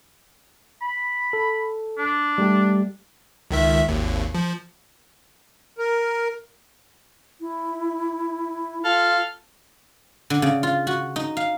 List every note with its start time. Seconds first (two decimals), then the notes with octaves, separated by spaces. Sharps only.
0.82 B5
1.33 A4
1.98 D4
2.38 G3 A3 G4
3.51 C#2 D#3 E5
3.88 G#1 D#2
4.35 F3
5.78 A#4
7.41 E4
8.85 F4 A4 F5
10.30 D3
10.42 C#3
10.63 F4
10.87 F#4
11.16 D#4
11.37 F5